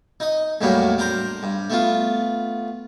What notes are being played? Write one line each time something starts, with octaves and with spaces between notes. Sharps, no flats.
D#4 D#5
E2 A2 F#3 G3 A#3 D4
D4 A#4 C5 A#5
G2
A3 B3 F4